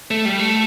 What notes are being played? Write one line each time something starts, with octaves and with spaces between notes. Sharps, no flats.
A3
G3
A3